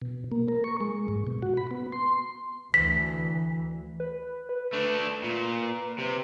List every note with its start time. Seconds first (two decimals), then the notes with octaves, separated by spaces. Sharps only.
0.01 B2
0.32 A#3
0.48 A#4
0.64 C#6
0.81 G#3
1.08 G#2
1.27 B2
1.42 F#4
1.57 B5
1.71 B3
1.92 C6
2.74 D2 E3 B6
4.00 B4
4.49 B4
4.73 A3 D4
5.23 A#2
5.99 C3